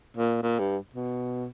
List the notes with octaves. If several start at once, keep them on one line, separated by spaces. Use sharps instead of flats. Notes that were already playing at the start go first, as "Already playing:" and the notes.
A#2
A#2
G2
B2